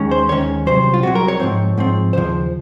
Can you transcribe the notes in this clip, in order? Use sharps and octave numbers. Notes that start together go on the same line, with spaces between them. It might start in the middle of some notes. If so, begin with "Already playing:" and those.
Already playing: D#2 D#3 G#3 C#4
C5
D#2 D#3 G#3 C#4 C#5
C2 C3 F#3 C5
F4
C2 C3 F#3 F#4
A#4
C#5
G#2 F3 C4
G#2 F3 C4
D#2 C#3 F3 C5